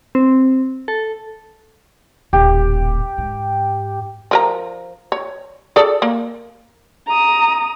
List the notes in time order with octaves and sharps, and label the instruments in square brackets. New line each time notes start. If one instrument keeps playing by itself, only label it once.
[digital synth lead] C4
A4
[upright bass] D#1 A1 [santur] G4
[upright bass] G#2
[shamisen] F3 A#4 A#5
C#5
G#4 A4 D5
A#3
[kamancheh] A#5 D#6